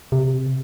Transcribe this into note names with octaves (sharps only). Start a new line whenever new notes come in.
C3